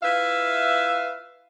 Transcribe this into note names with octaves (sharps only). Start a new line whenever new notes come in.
E4 F4 B4 E5 F5